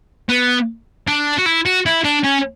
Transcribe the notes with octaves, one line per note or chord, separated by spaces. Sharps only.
B3
D4
F#4
E4
F#4
E4
D4
C#4